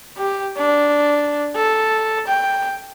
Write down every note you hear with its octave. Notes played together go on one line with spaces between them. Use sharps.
G4
D4
A4
G5